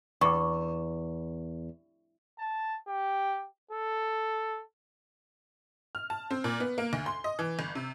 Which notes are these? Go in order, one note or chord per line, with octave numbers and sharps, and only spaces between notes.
E2 C#6 D6
A5
G4
A4
F6
A5
C4
A#2
B3
A#3
D2
C6
D#5
E3
G1
C3